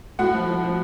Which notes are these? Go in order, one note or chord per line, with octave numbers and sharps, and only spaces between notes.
A2 F#4 F#5
F3
F3
F3